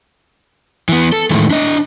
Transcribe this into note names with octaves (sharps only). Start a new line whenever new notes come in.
E3 B3
A4
A2 D#3 E3 G#3 A3
D4 D#5